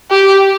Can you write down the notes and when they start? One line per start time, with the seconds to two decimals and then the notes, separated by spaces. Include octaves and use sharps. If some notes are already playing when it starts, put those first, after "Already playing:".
0.11 G4